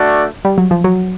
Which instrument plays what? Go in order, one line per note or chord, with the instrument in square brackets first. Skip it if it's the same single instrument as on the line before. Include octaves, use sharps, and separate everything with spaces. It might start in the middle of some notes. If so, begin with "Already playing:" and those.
Already playing: [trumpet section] A3 D4 F#4 A4 D5
[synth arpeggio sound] G3
F#3
F3
F#3